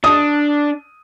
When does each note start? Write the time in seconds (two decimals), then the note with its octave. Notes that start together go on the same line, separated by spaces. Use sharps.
0.04 D4 D#6